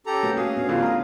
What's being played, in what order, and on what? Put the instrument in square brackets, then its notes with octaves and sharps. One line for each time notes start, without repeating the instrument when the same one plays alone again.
[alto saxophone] C#4 [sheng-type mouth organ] G4 A4 A#5
[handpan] A3 F#4 [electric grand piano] A#3 B4
[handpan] A3 [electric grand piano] F#4 D#6 [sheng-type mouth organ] G#4 F5
[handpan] B3 D4
[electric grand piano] A2 D3 G3 [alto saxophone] F4
[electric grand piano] A#5 D#6